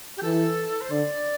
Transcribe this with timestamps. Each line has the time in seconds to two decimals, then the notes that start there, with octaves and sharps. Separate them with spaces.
0.17 G4
0.22 E3 A4
0.81 C5
0.90 D3 D5